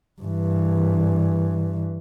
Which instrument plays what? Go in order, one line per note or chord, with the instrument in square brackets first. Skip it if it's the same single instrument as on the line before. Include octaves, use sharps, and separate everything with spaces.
[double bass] G2 E3